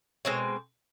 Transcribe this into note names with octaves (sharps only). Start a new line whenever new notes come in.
B2 G#3 C4 C#5